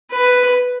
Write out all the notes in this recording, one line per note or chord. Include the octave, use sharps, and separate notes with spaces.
B4